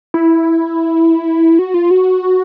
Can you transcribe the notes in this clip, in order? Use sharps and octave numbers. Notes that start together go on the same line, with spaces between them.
E4
F#4
F4
F#4